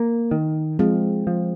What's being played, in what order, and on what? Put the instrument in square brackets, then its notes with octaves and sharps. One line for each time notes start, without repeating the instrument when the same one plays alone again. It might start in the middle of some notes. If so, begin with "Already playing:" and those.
Already playing: [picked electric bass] A#3
D#3
[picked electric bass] F3 [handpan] G#3 C4
[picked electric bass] F3